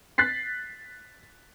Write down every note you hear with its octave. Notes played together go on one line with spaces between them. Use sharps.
F#6 A6 B6 C7